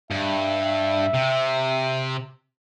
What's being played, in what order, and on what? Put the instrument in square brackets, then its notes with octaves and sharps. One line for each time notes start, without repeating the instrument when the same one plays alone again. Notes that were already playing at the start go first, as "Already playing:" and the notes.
[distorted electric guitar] G2 [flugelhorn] E5
[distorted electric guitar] C3